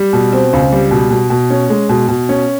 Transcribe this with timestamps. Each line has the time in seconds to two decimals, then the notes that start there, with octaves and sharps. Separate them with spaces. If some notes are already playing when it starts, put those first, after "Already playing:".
Already playing: G3
0.13 B2
0.32 C4
0.53 C#2
0.72 G3
0.91 B2
1.11 B2
1.30 B2
1.50 C#4
1.70 G#3
1.89 B2
2.08 B2
2.29 C#4